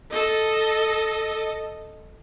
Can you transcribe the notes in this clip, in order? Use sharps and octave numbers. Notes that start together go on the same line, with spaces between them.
A4 D#5